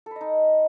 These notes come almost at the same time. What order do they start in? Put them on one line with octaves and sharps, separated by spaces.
A4 B4 D#5 D#4